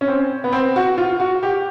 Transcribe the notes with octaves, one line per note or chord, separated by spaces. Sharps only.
C#4
C4
B3
C4
F#4
F4
F#4
G4